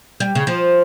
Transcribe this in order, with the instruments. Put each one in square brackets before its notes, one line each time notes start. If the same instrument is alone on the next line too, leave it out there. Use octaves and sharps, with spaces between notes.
[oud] G3
C#3
F3